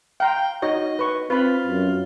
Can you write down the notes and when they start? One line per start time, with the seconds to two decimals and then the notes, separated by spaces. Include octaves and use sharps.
0.20 F5 G5 A#5 C6
0.62 D#4 F#4 C#5 D#5
0.99 B4 C#6
1.30 C4 F4 B4 B5
1.67 F#2